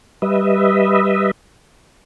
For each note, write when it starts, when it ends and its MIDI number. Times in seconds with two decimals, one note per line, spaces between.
0.22 1.31 55
0.22 1.31 71
0.22 1.31 75
0.22 1.31 76